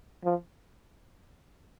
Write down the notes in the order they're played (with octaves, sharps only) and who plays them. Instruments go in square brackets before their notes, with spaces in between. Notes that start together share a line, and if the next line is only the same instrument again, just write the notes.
[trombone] F3